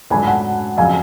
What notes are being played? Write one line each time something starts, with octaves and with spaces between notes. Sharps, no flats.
G#2 F#3 A3 D4 G#5 B5
F#5 A5
F2 C#3 F#3 F5 G#5